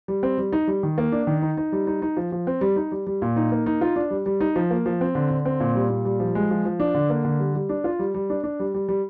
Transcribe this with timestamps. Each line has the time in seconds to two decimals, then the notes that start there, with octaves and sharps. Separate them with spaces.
0.08 G3
0.23 C4
0.38 G3
0.53 D#4
0.67 G3
0.83 D#3
0.98 A#3
1.12 D4
1.27 D#3
1.42 D#4
1.57 D#4
1.72 G3
1.87 D#4
2.02 D#4
2.17 F3
2.32 F3
2.47 C4
2.61 G3
2.76 D#4
2.92 G3
3.07 G3
3.22 A#2
3.36 D#4
3.52 A#3
3.66 D#4
3.81 F4
3.96 D4
4.11 G3
4.26 G3
4.41 D#4
4.56 F3
4.71 A#3
4.86 F3
5.01 C4
5.15 D3
5.30 D3
5.45 C4
5.60 A#2
5.75 G3
5.90 A#2
6.05 G3
6.20 F3
6.35 G#3
6.51 F3
6.65 F3
6.80 D4
6.95 D3
7.10 A#3
7.25 D3
7.39 G3
7.55 G3
7.69 D4
7.84 F4
7.99 G3
8.15 G3
8.30 D4
8.44 D4
8.60 G3
8.74 G3
8.89 G3